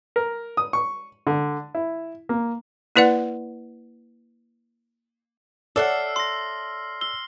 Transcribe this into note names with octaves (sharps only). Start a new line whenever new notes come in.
A#4
D#6
C#6
D3
E4
A#3
A#3 E4 B4 D5 F#5
A4 C#5 D5 E5 F#5 E6 F6 C7
C6 A#6
E6 G7